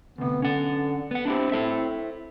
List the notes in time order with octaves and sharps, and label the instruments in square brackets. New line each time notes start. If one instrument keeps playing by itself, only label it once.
[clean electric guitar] D2 C3 [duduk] B3
[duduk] D3 [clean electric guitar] C#4 F#5
[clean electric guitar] B3 F#5
[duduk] C4 [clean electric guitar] D4 E4 G4
[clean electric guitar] E4 A4 E5